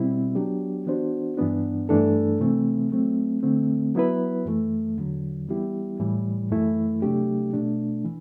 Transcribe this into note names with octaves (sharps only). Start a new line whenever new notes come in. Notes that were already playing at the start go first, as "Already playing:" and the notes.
Already playing: B2 G3 C4 E4
F#3 B3 D4 G4
E3 B3 D4 F#4 C5
G2 E3 B3 D4
G2 E3 A3 D4 A4
C3 E3 A3 C4
F#3 A3 C4
D3 A3 C4
F#3 B3 E4 B4
F#2 E3 A3
E2 D3 F#3
E3 G3 B3 E4 G4
A2 E3 G3
F#2 E3 A3 E4
C3 F#3 A3 D4 G4
B2 A3 D4
E3